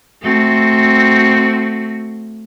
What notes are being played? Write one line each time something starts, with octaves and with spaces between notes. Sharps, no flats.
A3 C4 F#4